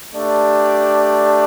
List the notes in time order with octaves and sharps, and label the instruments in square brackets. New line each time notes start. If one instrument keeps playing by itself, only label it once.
[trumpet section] A3 D4 G4 D5